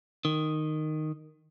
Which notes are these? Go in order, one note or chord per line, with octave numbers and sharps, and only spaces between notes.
D#3